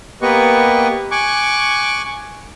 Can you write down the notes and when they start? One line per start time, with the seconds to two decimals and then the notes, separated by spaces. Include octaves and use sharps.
0.22 A#3 B3 G4 B4 D#5 C#6
1.11 G#5 C#6 D6 F#6